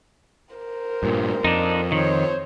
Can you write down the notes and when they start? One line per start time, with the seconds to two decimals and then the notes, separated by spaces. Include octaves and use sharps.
0.55 A#4 C5
1.03 G2 A#2
1.44 F2 D4 D#4
1.92 D#3 C5 C#5